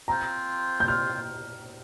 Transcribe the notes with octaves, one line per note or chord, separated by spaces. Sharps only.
C4 F4 C5 A#5
G6
F6